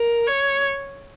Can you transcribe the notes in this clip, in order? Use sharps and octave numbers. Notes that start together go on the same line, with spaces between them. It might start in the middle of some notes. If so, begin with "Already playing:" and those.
Already playing: A#4
C#5